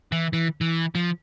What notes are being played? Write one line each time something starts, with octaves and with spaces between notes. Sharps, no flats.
E3
E3
E3
F3